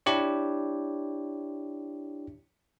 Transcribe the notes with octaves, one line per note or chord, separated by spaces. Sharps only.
D4 E4 G4 C#5